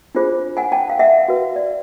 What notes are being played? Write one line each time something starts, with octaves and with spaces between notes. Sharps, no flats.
D4 F4 G#4 C5
F#5 G#5
G5 A5
F5
E5 F#5
F#4 B4
D5